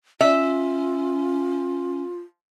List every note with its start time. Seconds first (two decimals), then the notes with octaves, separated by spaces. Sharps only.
0.21 C#4 F4 E5